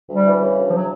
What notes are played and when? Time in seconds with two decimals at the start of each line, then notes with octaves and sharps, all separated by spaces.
0.09 D2 G3
0.25 E3
0.41 C#3
0.57 D2
0.67 F3
0.73 F#3